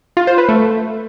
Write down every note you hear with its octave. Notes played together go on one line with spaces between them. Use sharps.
F4
C5
B4
A3